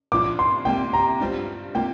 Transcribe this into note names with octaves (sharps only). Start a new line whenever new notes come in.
A#2 F3 D4 F4 D6
C6
C2 C3 A#3 G5
A#5
G2 G3 C4 F4
C3 A#3 F4 G5